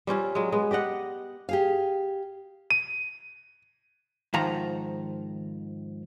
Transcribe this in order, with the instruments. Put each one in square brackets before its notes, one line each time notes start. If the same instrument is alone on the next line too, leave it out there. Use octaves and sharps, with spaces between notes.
[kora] G3 C4 C#4 F4
F#3 G#3
G#3 B3
G4 D5 D#5 F#5
[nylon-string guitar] G4 G#4 F5
[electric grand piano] D#7
[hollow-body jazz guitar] G#2 D#3 F3 A#5